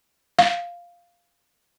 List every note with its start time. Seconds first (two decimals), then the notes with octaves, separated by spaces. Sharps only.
0.39 F5